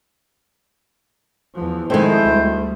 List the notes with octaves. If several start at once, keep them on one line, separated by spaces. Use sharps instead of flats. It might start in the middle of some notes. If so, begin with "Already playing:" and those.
E2 F3
D#3 F3 G#3 A3 C4 E4 C5
D2 G3